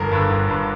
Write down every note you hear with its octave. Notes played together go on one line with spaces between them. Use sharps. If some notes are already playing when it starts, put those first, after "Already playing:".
Already playing: G1 A#4
G2 D3
G1
G2 D3